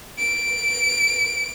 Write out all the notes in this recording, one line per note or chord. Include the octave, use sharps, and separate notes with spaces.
D7